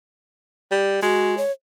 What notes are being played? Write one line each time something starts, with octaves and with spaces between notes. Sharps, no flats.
G3
G#3 F#4
C#5